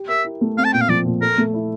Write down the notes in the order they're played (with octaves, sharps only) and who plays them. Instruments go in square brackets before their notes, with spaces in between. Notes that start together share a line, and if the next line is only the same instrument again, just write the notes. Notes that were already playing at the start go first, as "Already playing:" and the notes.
Already playing: [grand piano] G4
[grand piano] A#4 [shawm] E5
[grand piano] E4
A3
[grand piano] C4 [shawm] F5
[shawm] A5
[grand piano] A#2 [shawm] G5
[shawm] F5
[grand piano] F3 [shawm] D5
[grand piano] A#2
[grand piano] A4 [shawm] A#4
[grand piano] A3
E4